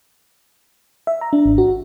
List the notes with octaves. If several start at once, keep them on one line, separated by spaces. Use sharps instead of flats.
E5
A#5
D4
G#1
F#4